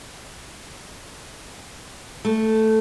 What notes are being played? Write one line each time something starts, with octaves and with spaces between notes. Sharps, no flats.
A3